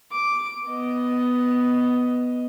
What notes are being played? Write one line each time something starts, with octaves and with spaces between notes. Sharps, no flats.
D6
B3 D#5